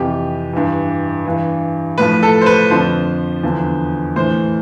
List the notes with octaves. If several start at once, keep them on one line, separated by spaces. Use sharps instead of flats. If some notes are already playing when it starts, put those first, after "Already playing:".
Already playing: F2 C3 E3 G4
G2 E3
G2 E3
A2 F3 B4
A4
C5
B4
F2 D3 F3 C5
E2 D3 F3
A2 E3 C5